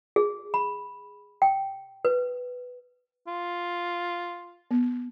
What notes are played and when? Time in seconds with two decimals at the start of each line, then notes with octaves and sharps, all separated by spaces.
0.16 G#4
0.54 B5
1.42 G5
2.05 B4
3.27 F4
4.71 B3